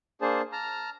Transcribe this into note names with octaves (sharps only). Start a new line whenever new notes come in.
A#3 D4 G#4 C5 A5
A5 A#5 F6